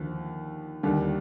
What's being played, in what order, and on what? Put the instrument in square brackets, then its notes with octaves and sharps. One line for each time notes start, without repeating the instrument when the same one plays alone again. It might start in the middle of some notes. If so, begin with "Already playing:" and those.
Already playing: [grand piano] D#2 D3 F3
D#2 D3 G3